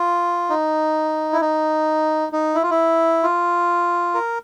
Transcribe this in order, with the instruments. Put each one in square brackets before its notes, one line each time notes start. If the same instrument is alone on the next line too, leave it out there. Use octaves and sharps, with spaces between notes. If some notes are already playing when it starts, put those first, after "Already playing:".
Already playing: [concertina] F4
D#4
E4
D#4
D#4
E4
F4
E4
F4
A#4